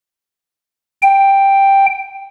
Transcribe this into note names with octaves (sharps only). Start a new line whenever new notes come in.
G5